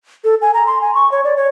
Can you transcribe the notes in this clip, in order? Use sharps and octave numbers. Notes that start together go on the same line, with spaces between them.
A4
G#5
A#5
C6
G#5
C#6
C#5
D5
C#5